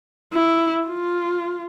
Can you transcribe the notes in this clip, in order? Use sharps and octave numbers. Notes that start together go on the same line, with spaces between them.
E4
F4